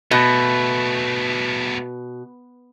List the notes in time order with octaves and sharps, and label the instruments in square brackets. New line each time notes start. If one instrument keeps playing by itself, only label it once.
[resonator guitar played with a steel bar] B2 [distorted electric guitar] A3 B3